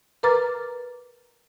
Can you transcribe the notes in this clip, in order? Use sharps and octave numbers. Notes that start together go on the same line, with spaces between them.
A#4 B4 A#5 D6 F6 A6